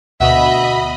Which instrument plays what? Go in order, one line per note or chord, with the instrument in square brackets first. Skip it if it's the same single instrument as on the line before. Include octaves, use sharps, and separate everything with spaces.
[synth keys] D2 B2 [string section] D#5 B5 [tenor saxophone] E5 [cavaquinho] F#5 D#6